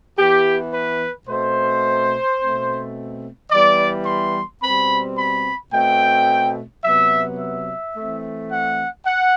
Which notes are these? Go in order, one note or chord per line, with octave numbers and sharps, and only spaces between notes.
E3 B3 G4
B4
B2 A3 C4 C5
B2 A3 C4
E3 G3 B3 D5
C6
B2 G3 C4 B5
B5
B2 A3 C4 G5
C3 F#3 B3 E5
E5
E3 A3 C4
F#5
F#5